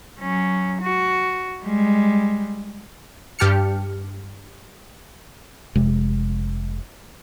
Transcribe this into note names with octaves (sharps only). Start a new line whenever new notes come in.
F#3 C#4
F#4
G3 G#3
G2 G4 A5 F6 C#7
F1 C3 G#3